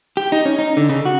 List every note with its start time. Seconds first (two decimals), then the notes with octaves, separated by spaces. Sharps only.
0.17 G4
0.32 D#4
0.45 C#4
0.59 D#4
0.77 D3
0.89 C#3
1.05 F#4